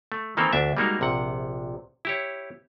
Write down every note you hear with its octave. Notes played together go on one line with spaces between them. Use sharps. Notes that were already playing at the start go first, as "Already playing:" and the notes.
A3
D#3 E3 A#3 C4 A4 A#4
D2 D4 E5
G3 G#3 A#3 D#4 F#4 A#4
A#1 C3 F#5
E4 G4 C#5